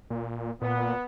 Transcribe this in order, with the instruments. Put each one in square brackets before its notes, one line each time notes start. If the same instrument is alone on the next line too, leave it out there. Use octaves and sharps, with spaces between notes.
[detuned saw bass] A#2
[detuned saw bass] A#2 [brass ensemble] B3